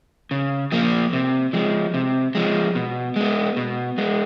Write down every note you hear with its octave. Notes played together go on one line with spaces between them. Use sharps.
C#3
F3 A#3
C3
F3 G#3
C3
F3 G#3
B2
G#3 B3
B2
G#3 B3